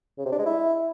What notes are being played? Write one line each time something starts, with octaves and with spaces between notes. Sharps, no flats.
C#3
C3
D4
G#3
E4